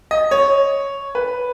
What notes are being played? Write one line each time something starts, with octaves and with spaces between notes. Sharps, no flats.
D#5
C#5
B4